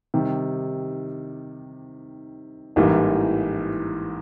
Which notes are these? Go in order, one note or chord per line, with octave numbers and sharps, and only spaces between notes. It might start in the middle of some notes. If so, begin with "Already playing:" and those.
C3 D#3 G3
A1 G#2 E3 G3 A#3